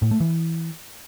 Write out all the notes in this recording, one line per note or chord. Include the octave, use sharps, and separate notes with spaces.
A2
A3
E3